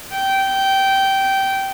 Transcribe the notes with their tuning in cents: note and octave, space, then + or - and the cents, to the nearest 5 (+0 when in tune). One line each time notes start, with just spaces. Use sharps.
G5 -15